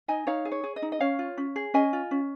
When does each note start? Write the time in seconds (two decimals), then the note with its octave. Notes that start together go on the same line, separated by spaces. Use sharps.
0.08 D#4 D#5 G#5
0.27 D#4 C#5 F5
0.45 G#4
0.52 C#5
0.64 G#4
0.76 D#5
0.82 D#4
0.92 D#5
1.00 C#4 C#5 F5
1.19 F4
1.38 C#4
1.56 G#4
1.74 C#4 D#5 G#5
1.93 F4
2.11 C#4